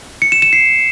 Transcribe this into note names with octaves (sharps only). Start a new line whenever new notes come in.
C#7
E7
E7
C7